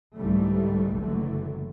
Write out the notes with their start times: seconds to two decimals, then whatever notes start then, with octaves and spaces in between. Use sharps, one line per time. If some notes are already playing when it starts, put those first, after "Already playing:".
0.15 C2 G#2 D3 E3 G3 A3
0.96 F#1 A2 D3 E3 F#3 A3